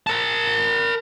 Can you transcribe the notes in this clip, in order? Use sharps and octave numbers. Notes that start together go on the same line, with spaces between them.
A#4 A5